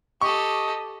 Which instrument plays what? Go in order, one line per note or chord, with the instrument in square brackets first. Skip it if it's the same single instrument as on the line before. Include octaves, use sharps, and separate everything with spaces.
[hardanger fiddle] G4 A4 [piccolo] D#5 [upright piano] C#6